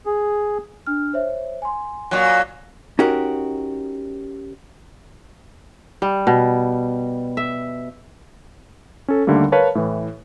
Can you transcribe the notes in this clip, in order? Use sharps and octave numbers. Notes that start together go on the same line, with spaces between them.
G#4
D4 F6
C5 C#5 E5
G#5 C6
A#2 F#3
C#4 D#4 F#4 G4 A#4
G3
B2
E5
C#4 A4
D#2 D3 G3 A3 A#3
A#4 B4 C#5 F5 A5
A2 E3